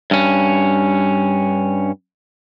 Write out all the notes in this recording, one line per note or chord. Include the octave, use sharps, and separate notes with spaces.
G2 C#4